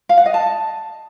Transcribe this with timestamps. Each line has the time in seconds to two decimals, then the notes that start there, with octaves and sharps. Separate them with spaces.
0.09 F5
0.18 F#5
0.26 D#5
0.34 A5